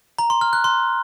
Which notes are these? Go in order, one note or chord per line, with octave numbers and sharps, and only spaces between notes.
A#5
C6
F6
F#6
C6